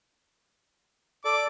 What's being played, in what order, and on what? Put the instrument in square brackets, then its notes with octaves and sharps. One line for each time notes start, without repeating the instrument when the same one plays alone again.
[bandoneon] A4 D5 [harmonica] D6